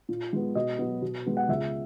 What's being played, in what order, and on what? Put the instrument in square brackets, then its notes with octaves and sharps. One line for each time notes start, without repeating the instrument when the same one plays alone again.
[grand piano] A#2
G#3 B3
B2 D#5
F#3 B3
B2
G#3 B3
F#5
C#2 E5